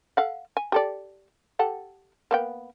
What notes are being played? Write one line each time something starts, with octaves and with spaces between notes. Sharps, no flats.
A4 F5 F#5
G#5
G4 A4 D5
G4 A4 F#5
A#3 B3 G5